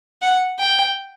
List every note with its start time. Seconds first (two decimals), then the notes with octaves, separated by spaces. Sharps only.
0.22 F#5
0.59 G5